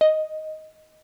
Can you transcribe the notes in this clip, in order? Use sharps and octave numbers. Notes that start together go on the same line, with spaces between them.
D#5